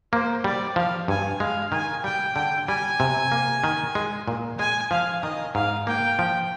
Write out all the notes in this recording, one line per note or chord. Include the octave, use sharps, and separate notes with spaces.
A#3 C5
G3 D5
F3 F5
G2 G#5
G#3 F5
D#3 G#5
G3 G5
D3 G5
G3 G#5
C3
A#3
D#3
G#3
A#2
G#3 G#5
F3 F5
D#3 D#5
G#2 F5
A#3 G5
F3